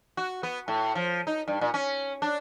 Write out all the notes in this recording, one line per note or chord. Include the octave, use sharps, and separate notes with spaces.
F#4
B3
A2
F3
D#4
G2
A#2
C#4
D4